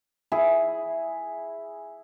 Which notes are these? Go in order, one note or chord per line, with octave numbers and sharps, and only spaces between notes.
E4 G#4